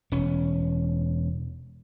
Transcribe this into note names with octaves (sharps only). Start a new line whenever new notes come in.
E1 C#4